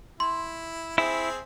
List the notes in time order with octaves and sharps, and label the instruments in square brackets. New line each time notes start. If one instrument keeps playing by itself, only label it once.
[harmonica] E4 [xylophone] C6
[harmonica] C4 G#4 [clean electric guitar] E4